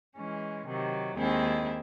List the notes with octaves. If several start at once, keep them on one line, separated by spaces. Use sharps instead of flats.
E3 G#3 C#4
C3 D#3 F#3
D#2 D#3 G#3 C4 E4